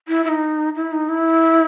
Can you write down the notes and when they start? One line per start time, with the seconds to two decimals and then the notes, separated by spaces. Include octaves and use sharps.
0.08 E4
0.25 E4
0.29 D#4
0.75 E4
0.92 D#4
1.09 E4